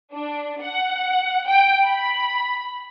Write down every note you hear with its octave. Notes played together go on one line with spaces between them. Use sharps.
D4
F#5
G5
B5